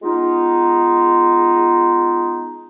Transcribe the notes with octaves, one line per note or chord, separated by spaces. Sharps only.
G#3 B3 D#4 F4